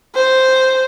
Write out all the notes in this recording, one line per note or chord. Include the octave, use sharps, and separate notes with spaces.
C5